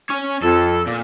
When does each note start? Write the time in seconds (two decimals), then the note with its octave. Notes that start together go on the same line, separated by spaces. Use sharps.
0.10 C#4 C#5
0.43 F2 A4
0.87 A#2